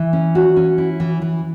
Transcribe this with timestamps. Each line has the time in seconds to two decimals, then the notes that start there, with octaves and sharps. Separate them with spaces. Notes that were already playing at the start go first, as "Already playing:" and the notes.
Already playing: E3
0.13 C#4
0.35 F#4
0.56 C#4
0.78 E4
1.00 E3
1.22 E3